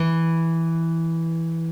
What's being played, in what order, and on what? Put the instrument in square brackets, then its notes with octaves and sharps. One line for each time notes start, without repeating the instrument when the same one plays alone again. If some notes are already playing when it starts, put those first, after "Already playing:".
Already playing: [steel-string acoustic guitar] E3